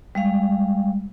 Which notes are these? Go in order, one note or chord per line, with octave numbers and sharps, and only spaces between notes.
G3 G#3 F5